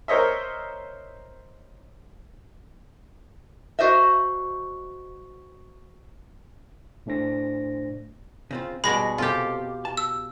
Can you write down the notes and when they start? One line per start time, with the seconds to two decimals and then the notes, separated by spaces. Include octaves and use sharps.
0.08 A#4 C5 C#5 D#5 E5
3.79 F#4 C5 D#5 E5
7.06 A2 A3 D4 C5 A#6
8.51 C#3 C4 F4
8.84 G#2 B2 G3 G#3 D5 B5 A#6
9.18 C3 C4 F4 G4 A4
9.85 A5
9.97 E6